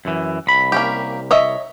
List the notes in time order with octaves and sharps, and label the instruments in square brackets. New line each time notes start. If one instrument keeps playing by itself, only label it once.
[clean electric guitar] F#2 E3
C2 B5
[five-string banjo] A#3 C#4 G4
C#5 D#5 E5